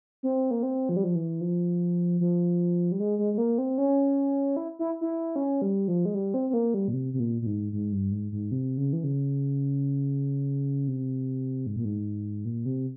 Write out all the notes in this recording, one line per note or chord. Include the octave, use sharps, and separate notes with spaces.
C4
A#3
C4
F3
G3
F3
E3
F3
F3
G3
G#3
G#3
G#3
A#3
C4
C#4
E4
E4
E4
C#4
G3
F3
G#3
G3
C4
C4
A#3
G3
A#2
C3
C3
A#2
A#2
G#2
G#2
G2
G#2
G#2
C3
C#3
E3
C#3
C3
G#2
A#2
G#2
A#2
C3